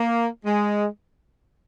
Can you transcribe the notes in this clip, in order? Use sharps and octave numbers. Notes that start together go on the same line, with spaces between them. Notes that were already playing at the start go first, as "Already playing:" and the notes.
Already playing: A#3
G#3